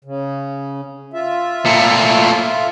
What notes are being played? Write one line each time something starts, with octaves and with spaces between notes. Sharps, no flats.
C#3
F4 E5
A#2 A3